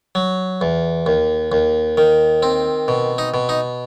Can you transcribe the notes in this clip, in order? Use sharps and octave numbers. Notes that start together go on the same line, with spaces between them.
F#3
E2
D#2
D#2
D#3
C4
B2
D#4
B2
D#4